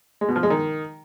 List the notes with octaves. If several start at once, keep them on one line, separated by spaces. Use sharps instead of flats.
G#3
B2
F3
G#3
D#3